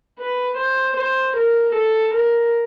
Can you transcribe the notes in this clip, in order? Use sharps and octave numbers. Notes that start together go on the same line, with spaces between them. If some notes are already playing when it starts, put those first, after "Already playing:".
B4
C5
C5
A#4
A4
A#4